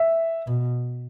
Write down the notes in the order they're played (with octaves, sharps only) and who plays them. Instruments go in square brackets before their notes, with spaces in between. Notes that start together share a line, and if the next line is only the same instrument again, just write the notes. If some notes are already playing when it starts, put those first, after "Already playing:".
Already playing: [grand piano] E5
[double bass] B2